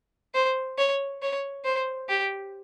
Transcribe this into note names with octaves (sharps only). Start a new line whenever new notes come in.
C5
C#5
C#5
C5
G4